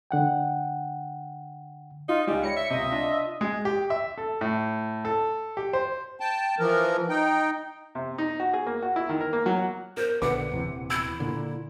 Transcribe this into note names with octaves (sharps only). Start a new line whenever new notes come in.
D3 F#5 G5
D#4 F4
C#2 G3 G#3 D#4
C#5 B5 A#6 C#7
E5
C#2 C3 D#5
D4 F4
G#3
G4
E5
A4
A2
A4
G4
C5
G5 A5
E3 F3 A#4
D#4 G5
C3
D#4
F#4
G#4
A#3
F#4
E4
D#3
A#4
A#3
F#3
F#5
A#4 C5
A#1 D3 B4 F#5 D6
D#1 C3 E3
E4 E6
A#2 D3